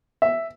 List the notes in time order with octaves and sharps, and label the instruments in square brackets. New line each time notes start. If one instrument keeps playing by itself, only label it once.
[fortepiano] E5